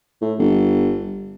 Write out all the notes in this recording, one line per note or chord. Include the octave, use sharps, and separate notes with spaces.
A2
G1